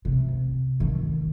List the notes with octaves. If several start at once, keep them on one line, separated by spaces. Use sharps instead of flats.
C3
D#3